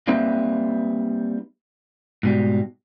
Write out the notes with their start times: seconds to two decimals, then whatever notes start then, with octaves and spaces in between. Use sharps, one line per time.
0.08 G3 A#3 C4 D#4 B4 E5
2.23 G#2 B2 G3